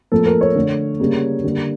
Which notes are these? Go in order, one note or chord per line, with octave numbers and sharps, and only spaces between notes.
A2 F3 A#3 A4
A#4
C#5
D3 A3
C#3 G3 A#3
D3 G3 A#3